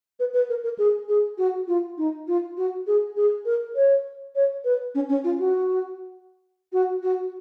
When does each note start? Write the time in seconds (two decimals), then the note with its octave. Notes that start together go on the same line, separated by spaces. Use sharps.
0.20 B4
0.34 B4
0.49 A#4
0.64 A#4
0.78 G#4
1.09 G#4
1.38 F#4
1.68 F4
1.98 D#4
2.28 F4
2.57 F#4
2.87 G#4
3.16 G#4
3.45 A#4
3.75 C#5
4.35 C#5
4.65 B4
4.95 C#4
5.09 C#4
5.24 F4
5.39 F#4
6.73 F#4
7.03 F#4